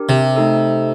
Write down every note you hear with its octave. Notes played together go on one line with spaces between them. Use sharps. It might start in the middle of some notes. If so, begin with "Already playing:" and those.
Already playing: D4 G4 A#4
C3
A3 D#4 A4